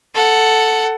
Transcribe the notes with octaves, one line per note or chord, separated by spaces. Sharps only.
A4 F#5